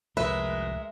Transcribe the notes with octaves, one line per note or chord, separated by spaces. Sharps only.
C2 F3 G#3 A3 A#4 B4 E5